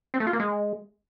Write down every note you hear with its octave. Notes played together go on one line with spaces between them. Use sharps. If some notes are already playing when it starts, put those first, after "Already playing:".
C4
A3
F4
A#3
G#3